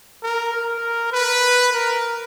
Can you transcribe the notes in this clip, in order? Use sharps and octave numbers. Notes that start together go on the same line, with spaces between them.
A#4
A#4
B4
A#4